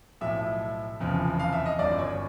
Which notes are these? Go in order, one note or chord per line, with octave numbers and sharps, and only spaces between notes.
B1 A2 F3 E5
F1 E2 C#3 F3
F5
E5
D#5
G1 F#2 D#3 D5
C#5